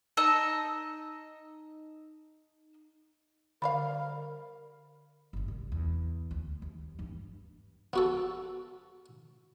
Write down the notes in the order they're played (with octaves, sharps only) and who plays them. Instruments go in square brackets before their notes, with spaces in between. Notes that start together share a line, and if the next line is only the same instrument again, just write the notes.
[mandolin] D#4 D#5 A5 E6
[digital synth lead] D3 [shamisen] G3 G4 F5 [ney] A#4 [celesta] C5 D5 B5
[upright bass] G1 D3
C2
E2
D2
D#2
G2 E3
[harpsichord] B3 F#4 A4